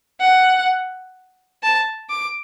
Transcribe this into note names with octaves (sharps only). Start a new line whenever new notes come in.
F#5
A5
D6